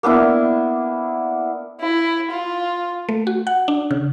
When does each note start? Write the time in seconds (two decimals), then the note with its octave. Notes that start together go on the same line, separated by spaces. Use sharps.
0.03 A#3 B3 D4 E4
1.81 E4
2.31 F4
3.09 A3
3.27 F#4
3.47 F#5
3.68 D4
3.91 C#3